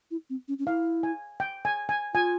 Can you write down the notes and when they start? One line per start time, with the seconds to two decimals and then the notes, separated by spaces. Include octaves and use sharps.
0.11 E4
0.30 C4
0.48 C#4
0.59 C#4
0.67 E4 F5
1.03 G#5
1.40 G5
1.65 G#5
1.89 G#5
2.14 F4 G#5